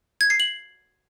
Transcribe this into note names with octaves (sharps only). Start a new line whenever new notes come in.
G#6
C7
F#7